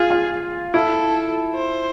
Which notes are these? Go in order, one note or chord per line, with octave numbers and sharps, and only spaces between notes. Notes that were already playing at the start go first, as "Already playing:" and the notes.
Already playing: F4 G#4
F4
E4 A4
C5